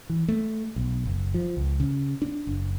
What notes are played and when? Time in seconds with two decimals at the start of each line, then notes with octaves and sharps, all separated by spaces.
0.10 E3
0.28 A3
0.76 B1
1.05 F#1
1.34 F3
1.57 C#2
1.80 C#3
2.22 D4
2.47 F#1